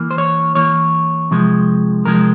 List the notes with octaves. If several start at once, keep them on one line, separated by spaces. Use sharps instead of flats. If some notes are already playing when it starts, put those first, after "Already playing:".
Already playing: E3 A#3
C5
C#5
E3 A#3 C#5
C3 F3 G#3
C3 F3 G#3 A#4